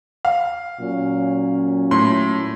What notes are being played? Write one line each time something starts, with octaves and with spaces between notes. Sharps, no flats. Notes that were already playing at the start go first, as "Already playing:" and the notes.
F5
A#2 F#3 C#4
A2 C6